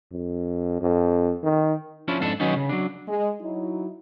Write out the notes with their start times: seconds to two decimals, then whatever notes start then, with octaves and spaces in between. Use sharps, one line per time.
0.11 F2
0.81 F2
1.43 D#3
2.08 F3 C#4 D4 E4
2.20 F2 G#2 D4 A4
2.40 D#3 F#3 B3 C#4 D#4
2.56 C#3
2.69 F#3 D4
3.08 G#3
3.41 F#3 D#4 E4